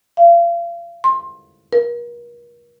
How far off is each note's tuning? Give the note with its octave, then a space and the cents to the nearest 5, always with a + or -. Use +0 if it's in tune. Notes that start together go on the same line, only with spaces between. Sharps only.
F5 -35
C6 +25
A#4 +40